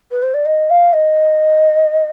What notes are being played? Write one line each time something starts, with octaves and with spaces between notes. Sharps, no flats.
B4
C5
D5
D#5
F5
D#5